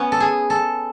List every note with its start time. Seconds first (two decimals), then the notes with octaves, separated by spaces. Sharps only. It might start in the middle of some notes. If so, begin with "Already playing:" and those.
Already playing: B3 C#4
0.12 A4
0.20 G#4
0.50 A4